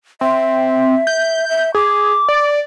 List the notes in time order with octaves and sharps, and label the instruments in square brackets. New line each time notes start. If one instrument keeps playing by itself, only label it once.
[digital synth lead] C4 [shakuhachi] E5
[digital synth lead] G6
[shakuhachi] E5
[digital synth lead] G#4 [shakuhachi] D6
[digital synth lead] D5